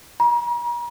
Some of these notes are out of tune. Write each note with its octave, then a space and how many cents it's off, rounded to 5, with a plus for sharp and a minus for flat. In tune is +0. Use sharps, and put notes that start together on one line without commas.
A#5 +40